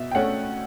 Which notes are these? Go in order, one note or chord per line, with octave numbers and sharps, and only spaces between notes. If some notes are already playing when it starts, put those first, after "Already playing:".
Already playing: B2 E5
G5
A3 C#4 F#5